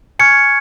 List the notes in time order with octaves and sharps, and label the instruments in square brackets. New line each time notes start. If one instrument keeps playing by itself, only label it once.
[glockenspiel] G#5 C#6 F6 G#6 C#7